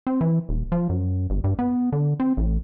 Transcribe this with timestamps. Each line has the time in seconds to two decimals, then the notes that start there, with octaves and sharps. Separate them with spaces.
0.07 C4
0.21 E3
0.49 D#1
0.72 F3
0.89 F#2
1.30 G1
1.44 G2
1.59 B3
1.92 D3
2.20 C4
2.37 A1